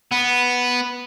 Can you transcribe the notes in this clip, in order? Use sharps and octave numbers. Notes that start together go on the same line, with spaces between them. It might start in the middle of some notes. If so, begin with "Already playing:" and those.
B3